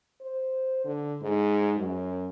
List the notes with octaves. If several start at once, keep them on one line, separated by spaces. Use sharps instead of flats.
C5
D3
G#2
F#2